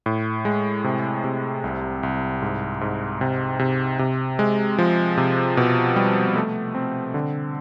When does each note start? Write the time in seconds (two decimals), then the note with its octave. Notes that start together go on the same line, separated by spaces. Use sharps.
0.06 A2
0.45 G#3
0.84 C3
1.24 C3
1.64 C2
2.03 C2
2.42 G#2
2.81 G#2
3.21 C3
3.59 C3
3.99 C3
4.39 G#3
4.78 F3
5.17 C3
5.57 B2
5.96 G3
6.36 A3
6.75 C4
7.14 D3